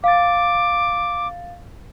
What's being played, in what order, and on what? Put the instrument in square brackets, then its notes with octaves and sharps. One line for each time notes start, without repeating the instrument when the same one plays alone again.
[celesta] F5 A6 [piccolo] D6